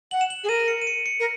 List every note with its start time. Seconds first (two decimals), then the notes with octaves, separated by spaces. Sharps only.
0.11 F#5 F#7
0.21 E7
0.30 F#7
0.44 G#4
0.49 A#4 D#7
0.68 C#7
0.82 D#7
0.87 C#7
1.06 C#7
1.20 A#4